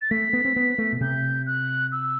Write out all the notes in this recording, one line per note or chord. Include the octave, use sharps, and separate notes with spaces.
A6
A3 B6
B3
C4
B3
A3
B2
C3 G6
F#6
E6